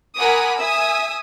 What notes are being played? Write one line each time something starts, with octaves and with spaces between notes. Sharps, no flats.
A#4 F#5 G#5 B5 D6 D#6
E5 G#5 D#6 E6